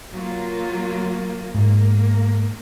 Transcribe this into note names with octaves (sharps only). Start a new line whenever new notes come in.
F#3 A#3 F4
G#2 A#3